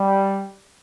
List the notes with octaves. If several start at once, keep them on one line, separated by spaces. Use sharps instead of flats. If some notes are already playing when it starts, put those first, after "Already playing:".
Already playing: G3